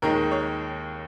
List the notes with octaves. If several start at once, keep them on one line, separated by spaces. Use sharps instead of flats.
D#2 D#3 G#3 A#4
C#5